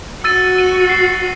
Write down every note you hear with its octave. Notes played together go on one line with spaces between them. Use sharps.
F#4 E6 A6 D#7
D#7
C7